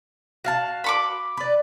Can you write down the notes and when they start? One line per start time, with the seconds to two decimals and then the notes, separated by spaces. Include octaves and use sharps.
0.44 F#4 F5 A5
0.84 B5 C#6 D6
1.37 B4 D5